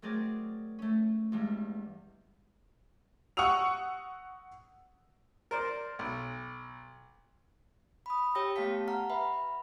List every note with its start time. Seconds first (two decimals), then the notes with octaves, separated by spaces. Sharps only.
0.02 F#3 A3 C4 G#4 A#4 D5
0.79 A3 C#4
1.32 E2 G2 G#3
3.37 F#5 C#6 D#6 E6 F7
5.51 A#4 C5 D5
5.99 B1
8.06 B5 D#6
8.35 G4 C#5 G5 E6 A#6
8.56 A3 B3 G4 F5 A5 B6
8.88 F#5 A#5 F6
9.10 B4 E5 B5